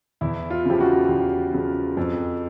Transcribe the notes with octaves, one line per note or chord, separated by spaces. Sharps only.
E2 E4
F4
C#3 F3 G4
F#4
E2 G4
C#3 F3
F2